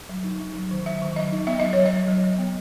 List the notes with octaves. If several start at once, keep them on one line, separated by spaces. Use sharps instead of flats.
F#3
D#4
D#4
F#3
D#3
F#3 E5
D#3
F#3 D#5
D#4
B3 E5
F#3 D#5
F#3 C#5
D#5
F#3
F#3
F#3
B3